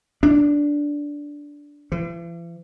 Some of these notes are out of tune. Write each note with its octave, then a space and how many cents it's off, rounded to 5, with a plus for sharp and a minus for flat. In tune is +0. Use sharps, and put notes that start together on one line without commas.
D4 -10
E3 +45